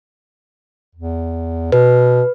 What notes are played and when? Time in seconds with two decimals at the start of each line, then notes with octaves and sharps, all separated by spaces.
0.95 E2
1.72 B2 B4